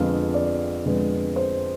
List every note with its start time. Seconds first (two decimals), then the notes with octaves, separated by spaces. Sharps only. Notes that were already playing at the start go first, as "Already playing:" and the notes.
Already playing: F2 D3 G#3 B3 F5
0.34 D5
0.85 F2 D3 G#3 B3
1.36 C5